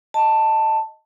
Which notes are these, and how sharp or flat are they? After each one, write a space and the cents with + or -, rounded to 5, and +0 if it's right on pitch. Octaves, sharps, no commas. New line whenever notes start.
D#5 +0 A5 +10